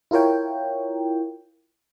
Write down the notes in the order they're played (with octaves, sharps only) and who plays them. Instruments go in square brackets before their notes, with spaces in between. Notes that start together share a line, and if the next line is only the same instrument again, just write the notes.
[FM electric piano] E4 F4 A#4 C#5 G5